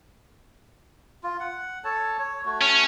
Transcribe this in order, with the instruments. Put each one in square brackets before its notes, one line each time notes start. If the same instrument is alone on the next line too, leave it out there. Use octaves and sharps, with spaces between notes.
[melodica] F4
F#5
A4 C#5 A5
C#5
A3 F#4
[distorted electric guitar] C#4